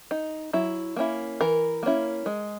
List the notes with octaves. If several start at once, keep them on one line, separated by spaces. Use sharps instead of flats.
D#4
F#3 E4
A#3 C#4 E4
E3 A#4
A#3 C#4 E4
G#3